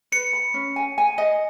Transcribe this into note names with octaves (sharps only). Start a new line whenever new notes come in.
B4 C#7
B5
C#4
G#5
G#5
D#5